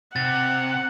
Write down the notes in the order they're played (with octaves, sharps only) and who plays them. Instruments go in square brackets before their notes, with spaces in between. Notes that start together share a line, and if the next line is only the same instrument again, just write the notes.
[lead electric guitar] C3 [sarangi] F#5 [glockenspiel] A6